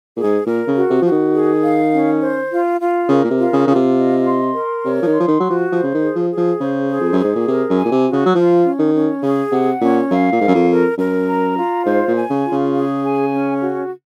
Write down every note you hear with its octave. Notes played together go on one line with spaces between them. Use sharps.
A#2 G#4
G#2
A#2 A#4
C#3
F#4
C3
F3 F#4
D#3
G#4
F5
C#4
C5
F4
F4
C#3 A#4
A#2
C3
F4
C#3
C#3 F4
C3
D#5
C6
A#4
C3 C#5
F3
D#3
C6
F3
D#3
F#3 F#4
F3
F3 C5
C#3
D#3
G#4
F3
G#4
F3
C#3 C5
G#4
F2
F#2
G#4
G#2
A#2
C3 A#4
F#2
G#5
A#2
C3
F#4
C#3
F#3
F3 F4
C#4
D#3
C#4
C#3 G#4
C3 F#5
A#2 C#4
F#2 F5
A#2
G#2 A#4
F#2
F2
A#4
F#2 A#4
A#5
F4
G#2 C5
A#2
G#5
C#3
F4
C#3
G#4
G#5
C#4
F#4